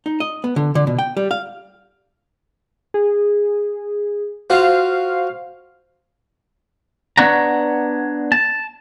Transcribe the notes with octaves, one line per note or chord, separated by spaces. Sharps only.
D#4
D#5
B3
D3
D3
B2
G5
G3
F5
G#4
F4 F#4 C5 F5
B3 D4 C#5 F#5 A#5
A5